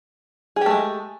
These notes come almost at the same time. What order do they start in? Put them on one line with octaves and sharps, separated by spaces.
G#4 G4 A3 G#3